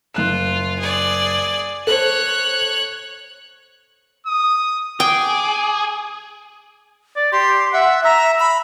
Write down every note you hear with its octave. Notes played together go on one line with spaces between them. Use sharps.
F#1 F4 F#6 E7
G#4 D5
A4 C5 C#5 F#6
D#6
G#4 G5 D6
D5
G4 C6
E5 F#5
E5 A#5
B5